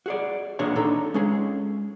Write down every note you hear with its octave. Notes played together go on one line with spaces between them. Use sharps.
F#4 G#4 D5
D#2 A#2 D4 F#4 G#4 C#5
D4 D#4 A4 A#5
G#3 C#4 G#4